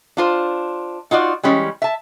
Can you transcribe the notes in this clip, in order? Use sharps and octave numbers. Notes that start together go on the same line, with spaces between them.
D4 F4 C5
D#4 F4 F#4 D5
E3 G3 G#3 C#4
E5 A5